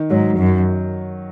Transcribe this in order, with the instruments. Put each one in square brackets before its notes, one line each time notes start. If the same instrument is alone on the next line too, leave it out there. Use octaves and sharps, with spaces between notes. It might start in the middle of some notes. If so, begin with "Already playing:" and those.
Already playing: [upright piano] D#3
[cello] G#2 [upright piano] F#3
[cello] F#2